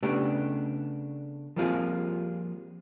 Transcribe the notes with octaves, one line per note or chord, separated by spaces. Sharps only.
C#3 A3 B3 D4 G4
F3 G3 A#3 C4 F4 G#4